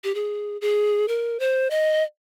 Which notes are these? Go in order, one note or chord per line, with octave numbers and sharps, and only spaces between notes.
G4
G#4
G#4
A#4
C5
D#5